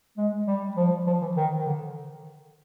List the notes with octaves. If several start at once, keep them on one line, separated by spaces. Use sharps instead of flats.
G#3
G3
F3
F3
E3
D#3
D3